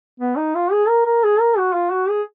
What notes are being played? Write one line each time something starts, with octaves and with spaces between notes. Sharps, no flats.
B3
D#4
F4
G#4
A#4
A#4
G#4
A#4
F#4
F4
F#4
G#4